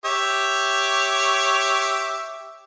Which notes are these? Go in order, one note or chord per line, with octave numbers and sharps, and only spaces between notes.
G4 C#5 E5